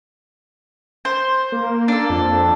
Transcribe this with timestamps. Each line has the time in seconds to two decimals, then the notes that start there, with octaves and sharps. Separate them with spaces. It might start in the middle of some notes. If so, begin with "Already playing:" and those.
1.05 C5
1.52 A#3
1.88 D4 A4
2.10 F2